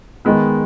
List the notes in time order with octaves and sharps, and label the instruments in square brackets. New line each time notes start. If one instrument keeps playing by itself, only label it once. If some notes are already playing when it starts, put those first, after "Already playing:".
[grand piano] D#3 G#3 B3